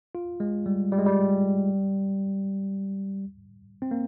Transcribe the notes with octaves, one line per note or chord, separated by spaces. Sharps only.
F4
G#3
G3
G3
G#3
G3
C4
A#3